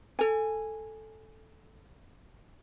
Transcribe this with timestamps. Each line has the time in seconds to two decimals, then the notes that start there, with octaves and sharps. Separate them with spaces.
0.19 A4 G#5